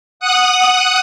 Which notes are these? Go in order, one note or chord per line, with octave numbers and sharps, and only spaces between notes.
F#5 D#6 F#6